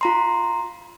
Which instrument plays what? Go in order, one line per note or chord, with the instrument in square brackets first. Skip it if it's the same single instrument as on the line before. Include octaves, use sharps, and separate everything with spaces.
[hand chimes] F4 A#5 C6